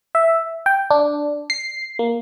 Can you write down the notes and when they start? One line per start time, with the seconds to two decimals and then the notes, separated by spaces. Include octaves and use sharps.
0.15 E5
0.66 G5
0.91 D4
1.50 C7
1.99 A#3